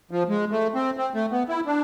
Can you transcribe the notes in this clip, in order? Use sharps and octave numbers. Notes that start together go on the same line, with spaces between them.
F3
G#3
A3
C4
C4
A3
B3
E4
D4